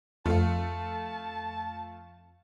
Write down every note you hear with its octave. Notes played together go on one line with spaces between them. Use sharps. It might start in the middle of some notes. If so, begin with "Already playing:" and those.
F2 A3 F4 A5